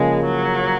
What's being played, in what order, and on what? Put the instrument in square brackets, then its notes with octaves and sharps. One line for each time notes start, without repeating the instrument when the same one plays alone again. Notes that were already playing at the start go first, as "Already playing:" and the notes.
Already playing: [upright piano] C#3 F3 A#3 [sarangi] G#3
[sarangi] F#3